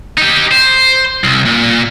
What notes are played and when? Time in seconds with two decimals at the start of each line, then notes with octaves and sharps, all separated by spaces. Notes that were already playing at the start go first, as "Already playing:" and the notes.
0.18 D#4 G4
0.51 C5
1.24 C2
1.45 A#2